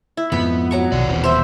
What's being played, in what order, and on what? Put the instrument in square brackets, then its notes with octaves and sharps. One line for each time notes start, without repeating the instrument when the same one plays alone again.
[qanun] E4
[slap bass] F2 G#2 F3 [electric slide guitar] B3 [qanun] B5
[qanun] F#3 A#5 C#6
[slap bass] B1 [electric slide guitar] D#3 D5
[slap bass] D#1 [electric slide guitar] B2 E3 C4
[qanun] C5 E5